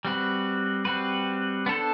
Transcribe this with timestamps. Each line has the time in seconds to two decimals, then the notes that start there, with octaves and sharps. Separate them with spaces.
0.05 G3 C4 F#4 B4
0.85 G3 C4 F#4 B4
1.66 B3 D4 A4 C5